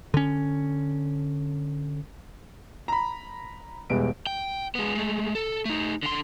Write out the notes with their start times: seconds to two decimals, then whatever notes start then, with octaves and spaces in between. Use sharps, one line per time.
0.14 D3 C#4
2.88 A#5 B5
3.90 E1 E2 G3 G#3 B4 D7
4.27 G5
4.75 G#3 B3
4.95 G#3 A3
5.35 A4
5.65 A3 D#4
6.03 D3 C6